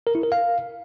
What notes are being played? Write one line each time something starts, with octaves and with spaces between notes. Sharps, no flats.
A#4
E4
A#4
F5